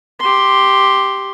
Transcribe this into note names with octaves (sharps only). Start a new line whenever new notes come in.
G4 C6